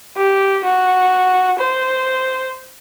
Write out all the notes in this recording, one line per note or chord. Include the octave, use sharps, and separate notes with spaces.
G4
F#4
C5